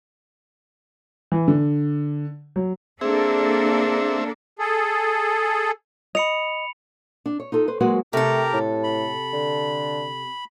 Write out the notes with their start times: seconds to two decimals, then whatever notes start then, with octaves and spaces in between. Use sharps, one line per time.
1.32 E3
1.48 D3
2.56 F#3
3.01 A#3 C4 D4 G#4 A4 E5
4.59 G#4 A4
6.15 D#5 B5 C#7 F7
7.26 D4
7.40 C#5
7.52 D#4 F4 A4
7.68 B4 C5
7.80 F#3 G#3 A#3 F#4 B4 C5
8.13 C3 A3 G4 A4 A#4 A#5
8.53 A2
8.84 B5
9.33 D3